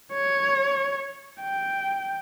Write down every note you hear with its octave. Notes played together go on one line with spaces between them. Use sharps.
C#5
G5